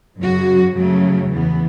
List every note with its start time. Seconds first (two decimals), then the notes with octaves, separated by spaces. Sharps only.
0.21 F#2 C#3 F#3 F#4
0.76 F#2 C#3 F#3 A3
1.31 E2 E3 B3